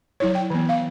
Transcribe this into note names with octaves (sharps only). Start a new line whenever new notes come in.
F#3 E4 C#5
G5
E3 B3
F5